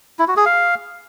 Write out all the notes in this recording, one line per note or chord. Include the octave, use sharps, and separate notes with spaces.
E4
F#4
G#4
F5